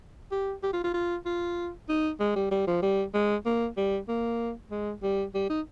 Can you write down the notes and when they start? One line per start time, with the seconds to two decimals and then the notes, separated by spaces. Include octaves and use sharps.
0.32 G4
0.63 G4
0.73 F4
0.84 F4
0.94 F4
1.26 F4
1.89 D#4
2.20 G#3
2.36 G3
2.51 G3
2.67 F3
2.82 G3
3.14 G#3
3.46 A#3
3.77 G3
4.08 A#3
4.71 G#3
5.03 G3
5.34 G3
5.50 D#4